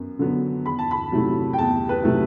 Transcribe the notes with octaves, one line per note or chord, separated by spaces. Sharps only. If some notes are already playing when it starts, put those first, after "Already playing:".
Already playing: F#2 B3
D3 F#3 B3
E2 B5
A5
B5
C3 F#3 A3 E4
G5
E2 A5
B4
C3 F#3 A3 E4